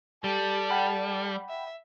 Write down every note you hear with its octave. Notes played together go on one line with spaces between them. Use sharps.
G3 G4 A4
F#5 G5 B5
E5